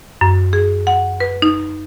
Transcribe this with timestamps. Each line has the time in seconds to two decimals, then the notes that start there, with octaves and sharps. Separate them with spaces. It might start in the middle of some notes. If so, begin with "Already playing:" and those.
0.21 F#2
0.53 G#4
0.87 F#5
1.20 B4
1.42 D#4